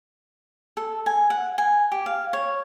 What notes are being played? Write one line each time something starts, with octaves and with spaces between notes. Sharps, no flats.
A4
G#5
F#5
G#5
G4
F5
C#5